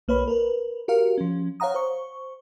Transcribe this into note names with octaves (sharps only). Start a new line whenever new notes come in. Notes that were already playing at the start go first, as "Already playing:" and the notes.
B1 A#3 B4 C#5 B5
A#4 B4
F#4 G4 A#4 F5
F3 C#4
C#5 F5 F#5 A#5 D#6
C5 C#6